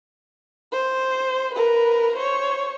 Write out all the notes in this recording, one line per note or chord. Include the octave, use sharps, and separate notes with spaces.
C5
A#4 B4
C5 C#5